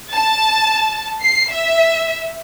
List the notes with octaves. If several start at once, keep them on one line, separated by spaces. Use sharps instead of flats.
A5
C7
E5